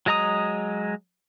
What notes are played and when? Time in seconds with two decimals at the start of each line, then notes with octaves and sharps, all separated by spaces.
0.06 F#3 G#3 D#5 A#5 D#6